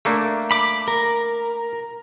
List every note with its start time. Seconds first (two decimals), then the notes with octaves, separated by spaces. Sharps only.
0.05 A3 A#3 D4
0.51 B5 D6
0.88 A#4